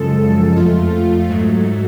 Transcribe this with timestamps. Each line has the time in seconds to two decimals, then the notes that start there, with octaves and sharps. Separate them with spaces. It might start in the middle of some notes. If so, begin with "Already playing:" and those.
Already playing: F#2 C#3 F3 G#3 A4
0.57 F2 F3 A3 F4
1.29 G#2 F#3 A3